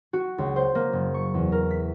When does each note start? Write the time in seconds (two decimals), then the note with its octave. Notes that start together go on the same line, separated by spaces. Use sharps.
0.13 F#4
0.38 C#2
0.56 C5
0.75 A#3
0.93 F#1
1.14 C#6
1.34 E2
1.52 A#4
1.71 B6